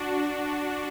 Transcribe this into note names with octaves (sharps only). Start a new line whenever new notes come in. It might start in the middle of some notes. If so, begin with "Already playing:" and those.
Already playing: D4 F#4